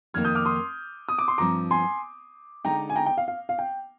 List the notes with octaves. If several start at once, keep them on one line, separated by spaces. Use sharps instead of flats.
F2 D#3 A#3 D#4 F6 G#6
D#6 G6
D6 F6
C6 D#6
D#6
D6
C6
G2 F3 C4 A#5 D6
G#5 C6
D3 G#3 D#4 G5 A#5
G#5
G5 A#5
G5
F5
F5
F5
G5